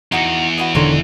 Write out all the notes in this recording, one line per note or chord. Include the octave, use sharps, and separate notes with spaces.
E2 D#4 F#4 D#5
F#4 B4 D#5
E1 D3 D#3 A#4 C#5 C6